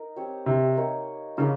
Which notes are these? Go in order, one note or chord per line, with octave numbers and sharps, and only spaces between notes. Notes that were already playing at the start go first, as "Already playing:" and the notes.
Already playing: D#4 A#4
C4 G4 C#5
C3
A#3 D#4 A#4 C#5
C#3 A#3 C#4 F4